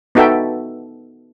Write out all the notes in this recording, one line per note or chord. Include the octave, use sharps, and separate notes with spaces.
B3 D#4 F#4 A4 E5 G5